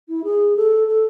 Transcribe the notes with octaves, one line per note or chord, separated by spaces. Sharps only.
E4
G#4
A4
A4